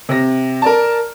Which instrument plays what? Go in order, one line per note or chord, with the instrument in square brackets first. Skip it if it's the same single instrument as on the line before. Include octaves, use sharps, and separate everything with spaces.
[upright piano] C3 A#6
A#4 D5 A5